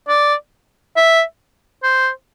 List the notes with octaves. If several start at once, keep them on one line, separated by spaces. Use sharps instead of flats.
D5
E5
C5